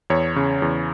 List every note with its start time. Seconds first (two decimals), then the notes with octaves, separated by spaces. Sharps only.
0.10 E2 C#5
0.36 C#3
0.62 E2